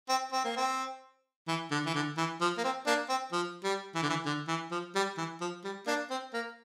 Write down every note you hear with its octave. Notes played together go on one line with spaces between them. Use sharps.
C4
C4
A#3
C4
E3
D3
E3
D3
E3
F3
A#3
C4
A#3 D4
C4
F3
G3
E3
D3
E3
D3
E3
F3
G3
E3
F3
G3
A#3 D4
C4
A#3